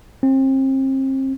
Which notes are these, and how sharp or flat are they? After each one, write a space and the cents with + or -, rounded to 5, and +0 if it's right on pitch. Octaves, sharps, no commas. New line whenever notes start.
C4 +35